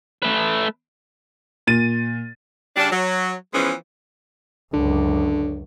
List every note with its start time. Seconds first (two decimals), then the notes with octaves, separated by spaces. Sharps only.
0.22 A3 B4
1.67 A#2 A6 D#7
2.77 C#3 G3 D4
2.91 F#3
3.54 E3 F3 G#3 B3 C#4
4.73 C#2 F#2 D3